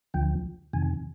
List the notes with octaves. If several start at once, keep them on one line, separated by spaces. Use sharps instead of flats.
D2 D3 F3 G5
F2 C3 D#3 G#5